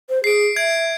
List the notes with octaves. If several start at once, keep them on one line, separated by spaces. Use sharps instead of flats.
C5
G#4 C7 D7
E5 G#6 D7